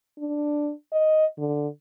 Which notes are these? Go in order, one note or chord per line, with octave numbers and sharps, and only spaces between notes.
D4
D#5
D3